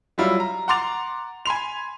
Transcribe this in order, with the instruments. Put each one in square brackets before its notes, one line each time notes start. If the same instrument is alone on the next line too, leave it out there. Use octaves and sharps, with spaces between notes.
[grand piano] F#3 G3 E4 F4
A#5
F#5 A#5 C6 D6 A6 F7
G#5 B5 C6 F7